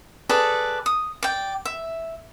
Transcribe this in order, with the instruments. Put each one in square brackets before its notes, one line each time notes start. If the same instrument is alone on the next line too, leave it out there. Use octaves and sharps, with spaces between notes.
[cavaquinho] G#4 A4 B4 D5
D#6
D5 G5
E5